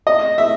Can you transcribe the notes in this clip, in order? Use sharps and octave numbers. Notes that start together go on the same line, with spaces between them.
D#5
E5